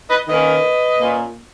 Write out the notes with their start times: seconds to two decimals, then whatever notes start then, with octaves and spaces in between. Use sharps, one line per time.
0.10 B4 D#5
0.28 D#3 A#3 C#4 B4 D#5
1.00 A#2 A#3 C#4